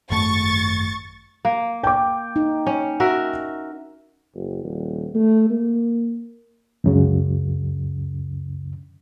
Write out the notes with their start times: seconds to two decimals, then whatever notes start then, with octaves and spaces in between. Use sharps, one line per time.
0.10 G#1 F#2 A3 C#6 A6
1.45 A#3
1.83 G5 D6
2.36 D#4
2.66 C#4
3.00 F#4 A#4 E5
4.35 F#1
4.64 D#1
5.15 A3
5.50 A#3
6.84 C#2 F#2 C#3